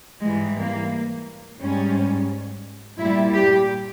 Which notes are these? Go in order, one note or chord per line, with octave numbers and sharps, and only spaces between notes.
G#2 E3 G3 G#3
A#3
G#2 G3 C#4
A#2 G3 E4
G4